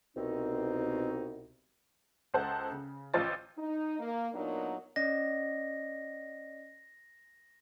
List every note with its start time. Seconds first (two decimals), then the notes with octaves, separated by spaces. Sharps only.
0.16 C2 B2 C4 D#4
2.34 C#2 A4 C5 F#5 A5
2.72 C#3
3.14 A1 F4 C5 D#5 A6
3.57 D#4
3.99 A#3
4.32 A#2 F#3 B3 D4 D#4 A#4
4.96 C#4 D5 D#5 A#6